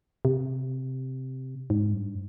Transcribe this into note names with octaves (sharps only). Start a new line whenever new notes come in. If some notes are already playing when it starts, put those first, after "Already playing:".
C3
G#2
G2